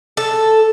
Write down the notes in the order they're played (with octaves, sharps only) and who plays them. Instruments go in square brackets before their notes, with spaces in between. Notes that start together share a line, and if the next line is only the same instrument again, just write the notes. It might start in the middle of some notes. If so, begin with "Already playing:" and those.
[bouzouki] A4